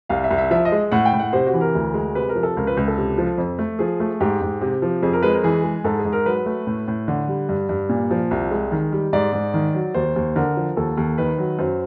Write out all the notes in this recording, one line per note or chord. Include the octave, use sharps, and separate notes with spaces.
C2 F5
E5
C2
E5
F3 E5
D#5
G#3
A2 F#5
G5
A2
F#5
C3 C5
F#4
E3
A#4
D2
G#3
C3 B4
A#4
F3
A4
C#2 A#4
B4
C#2
A4
C3
F3
F2
A3
F3 G#4
A3
G#2 G4
G#2
C3
F3
F2 G#4
A#4
G#3 B4
A#4
E3 G#4
G#3
G#2 A4
G#4
G#2
A#4
F#3 B4
A3
A2
A2
D3
G3
G2
G2
A#2
F3
C2
G#3
D#3
G3
G#2 D5
G#2
D#3
F#3
D#2 C5
D#2
D3 A#4
F3
D#2 A4
D#2
D#3 B4
F#3
F#2 C5